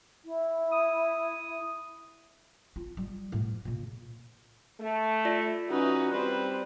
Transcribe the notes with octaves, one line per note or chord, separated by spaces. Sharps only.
E4
D#6
F4
G3
A2 F3
A#2 C#3
A3
F4 D5 E5
E3 C#4 D#4 F#4 B4
G3 C4 B4 C5